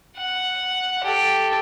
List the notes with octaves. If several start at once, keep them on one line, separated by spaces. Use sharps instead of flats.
F#5
G4 A4